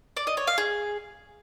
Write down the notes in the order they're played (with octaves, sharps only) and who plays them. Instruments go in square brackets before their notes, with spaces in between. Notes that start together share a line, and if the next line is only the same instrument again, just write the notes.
[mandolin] D5
D#5
C#5
F5
G#4